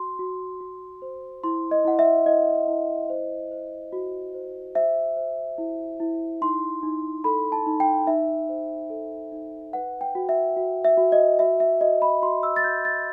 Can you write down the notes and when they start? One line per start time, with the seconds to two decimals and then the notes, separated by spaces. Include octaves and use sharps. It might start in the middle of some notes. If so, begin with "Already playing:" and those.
Already playing: F#4 C6
0.19 F#4
0.60 F#4
1.02 C5
1.44 E4 C6
1.71 D#5
1.85 E4 F#5
1.99 E5
2.26 E4 D#5
2.68 E4
3.10 C5
3.51 C5
3.93 F#4
4.34 C5
4.75 C5 E5
5.17 C5
5.58 E4
6.00 E4
6.41 D#4 C6
6.83 D#4
7.24 A4 B5
7.52 A5
7.66 D#4
7.80 G5
8.07 D#4 E5
8.49 C5
8.90 A4
9.32 D#4
9.73 B4 F#5
10.01 G5
10.15 F#4
10.29 E5
10.57 F#4
10.84 E5
10.97 F#4
11.12 D#5
11.39 F#4 E5
11.60 E5
11.81 F#4 D#5
12.02 B5
12.22 F#4 C6
12.43 E6
12.56 A6
12.64 F#4 G6
12.85 A6